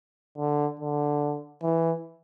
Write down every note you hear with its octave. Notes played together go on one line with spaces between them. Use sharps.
D3
D3
E3